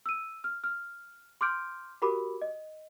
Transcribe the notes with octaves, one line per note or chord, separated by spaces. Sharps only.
E6 D#7
F6
F6
C6 D6 F6 G6 D7
F#4 G4 A#4 B5 D6
D#5